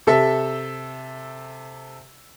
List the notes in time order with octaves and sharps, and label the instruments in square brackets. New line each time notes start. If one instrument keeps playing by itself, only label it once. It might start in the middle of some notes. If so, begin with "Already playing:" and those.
[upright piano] C3 A4 E5